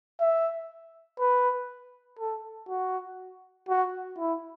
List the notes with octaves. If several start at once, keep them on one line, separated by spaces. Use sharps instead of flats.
E5
B4
A4
F#4
F#4
E4